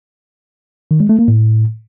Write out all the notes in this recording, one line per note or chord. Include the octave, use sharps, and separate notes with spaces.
D#3
G#3
A3
A#3
A2